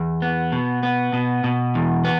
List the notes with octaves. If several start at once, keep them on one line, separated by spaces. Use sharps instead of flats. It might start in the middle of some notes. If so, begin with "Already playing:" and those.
Already playing: E2
B3
B2
B3
B2
B2
E2
B3